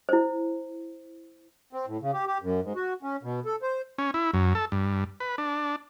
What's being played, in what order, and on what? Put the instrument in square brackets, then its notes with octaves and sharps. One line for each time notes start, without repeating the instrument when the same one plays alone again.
[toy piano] E4 C5
[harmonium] C4
A2
C#3
G4
G4
F#2
G#2
F#4
C#4
B2
A4
C5
[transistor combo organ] C#4
E4
F#2
A4
G2
B4
D4